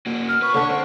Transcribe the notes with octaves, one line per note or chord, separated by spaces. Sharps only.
A#3 F#4
F6
B4 C#6
D3 D4 C#5
C4 C5